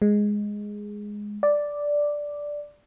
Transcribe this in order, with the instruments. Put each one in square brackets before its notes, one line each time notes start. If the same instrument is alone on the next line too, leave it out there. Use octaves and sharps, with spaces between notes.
[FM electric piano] G#3
D5